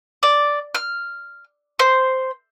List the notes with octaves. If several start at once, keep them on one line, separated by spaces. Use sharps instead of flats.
D5
F6
C5